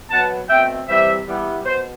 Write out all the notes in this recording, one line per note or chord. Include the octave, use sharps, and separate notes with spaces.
B2 F#3 B3 F#5 A5
B2 A3 C4 E5 G5
C3 E3 G3 C5 E5
E3 G3 B3
B2 C5